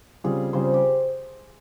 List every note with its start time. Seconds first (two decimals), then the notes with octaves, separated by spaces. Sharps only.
0.24 C#3 G3 C4 F4 G#4
0.53 C#3 G3 C4 F4 C5
0.74 G4